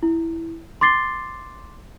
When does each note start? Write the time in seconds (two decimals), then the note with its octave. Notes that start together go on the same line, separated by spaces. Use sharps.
0.03 E4
0.81 C6 D6 A6 C7 G7